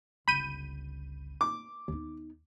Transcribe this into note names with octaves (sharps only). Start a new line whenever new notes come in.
G1 C#2 B5 G6 D#7
D6
D#2 B3 D#4